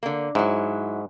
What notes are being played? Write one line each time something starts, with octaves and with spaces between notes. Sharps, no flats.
D3 A#3
G#2 F#3 E4